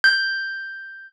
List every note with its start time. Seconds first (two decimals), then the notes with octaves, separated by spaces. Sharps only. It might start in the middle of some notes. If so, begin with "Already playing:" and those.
0.04 G6